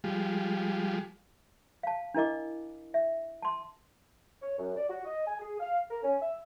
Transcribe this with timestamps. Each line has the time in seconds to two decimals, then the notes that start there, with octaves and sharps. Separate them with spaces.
0.04 F3 G3 G#3
1.83 F5 A5
2.14 D4 E4 A#4 D#5 D6
2.94 E5
3.42 A5 C6
4.42 C#5
4.59 F#2
4.76 D5
4.89 F#4
5.04 D#5
5.27 G#5
5.40 G#4
5.59 F5
5.91 A#4
6.03 C#4
6.21 E5